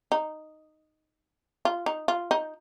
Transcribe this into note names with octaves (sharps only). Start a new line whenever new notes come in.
D#4
F4
D#4
F4
D#4